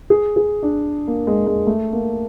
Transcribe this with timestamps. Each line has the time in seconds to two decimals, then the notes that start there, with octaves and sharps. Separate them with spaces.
0.10 G#4
0.36 G#4
0.63 D4
1.07 A#3
1.27 G#3
1.47 G#3
1.67 A3
1.93 A#3